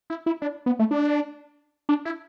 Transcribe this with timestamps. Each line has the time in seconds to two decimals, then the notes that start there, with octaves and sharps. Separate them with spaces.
0.10 E4
0.26 E4
0.42 D4
0.66 B3
0.79 A3
0.91 D4
1.89 D4
2.05 E4